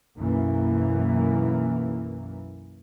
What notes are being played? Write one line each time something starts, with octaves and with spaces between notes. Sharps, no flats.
B1 F#2 E3 A#3